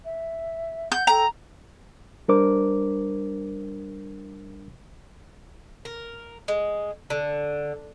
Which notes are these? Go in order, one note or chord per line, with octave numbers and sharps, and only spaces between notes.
E5
F#5 G6
A4 G5 A#5
G3 D4 A#4 C5 D6
A#4
G#3
D3